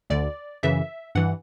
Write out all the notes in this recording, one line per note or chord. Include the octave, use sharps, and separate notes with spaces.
D2 D3 D5
F#2 C#3 E3 E5
G2 E3 F#5